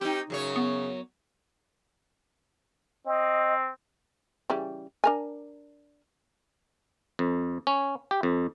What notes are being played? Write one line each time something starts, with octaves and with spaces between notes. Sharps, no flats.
C4 D#4 G4
F#2 C#3 F#3 C#5
B3
C4 D#5
C#3 E3 G3
D4 A#4 G#5
F2
C#4
G4
F2